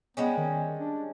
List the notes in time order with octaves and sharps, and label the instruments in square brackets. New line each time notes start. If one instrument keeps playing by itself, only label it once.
[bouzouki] G3 G#3 C#4 [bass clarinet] B3
[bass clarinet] D#3
D4